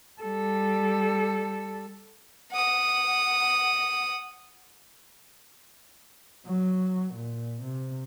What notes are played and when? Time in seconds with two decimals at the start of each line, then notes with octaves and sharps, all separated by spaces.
0.22 G3 A4
2.51 F#5 D#6
6.46 F#3
7.15 A#2
7.63 C3